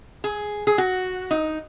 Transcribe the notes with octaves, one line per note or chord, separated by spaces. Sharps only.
G#4
G#4
F#4
D#4